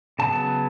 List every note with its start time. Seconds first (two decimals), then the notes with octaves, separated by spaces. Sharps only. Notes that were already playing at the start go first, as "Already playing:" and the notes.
0.19 C#3 F#3 B3 A5